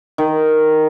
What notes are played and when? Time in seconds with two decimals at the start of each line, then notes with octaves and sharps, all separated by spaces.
0.18 D#3